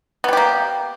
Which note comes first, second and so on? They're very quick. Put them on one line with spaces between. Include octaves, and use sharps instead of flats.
B3 G3 G4 A#3